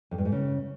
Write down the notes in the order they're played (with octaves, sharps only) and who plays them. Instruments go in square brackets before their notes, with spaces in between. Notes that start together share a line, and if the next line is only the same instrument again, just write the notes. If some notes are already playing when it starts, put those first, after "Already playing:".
[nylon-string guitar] F2
G2
G#2
C#3